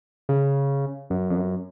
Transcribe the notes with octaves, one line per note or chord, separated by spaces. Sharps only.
C#3
F#2
F2
F#2